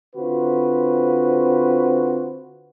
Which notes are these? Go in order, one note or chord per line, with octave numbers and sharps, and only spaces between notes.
D3 C4 F4 F#4 B4 C5